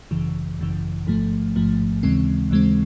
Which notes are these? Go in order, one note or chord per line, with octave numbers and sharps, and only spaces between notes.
G#1 F#2 C#3 E3
G#1 F#2 C#3 E3
A1 G#2 F3 A3
A1 G#2 F3 A3
D#2 C#3 E3 G#3 C4
D#2 C#3 E3 G#3 C4